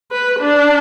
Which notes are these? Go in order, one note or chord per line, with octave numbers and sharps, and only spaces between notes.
B4
D4